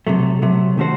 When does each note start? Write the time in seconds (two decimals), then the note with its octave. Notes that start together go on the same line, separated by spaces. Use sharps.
0.07 C3 F#3 A3
0.42 C3 F#3 A3
0.77 D#3 A3 C#4 F#4 C5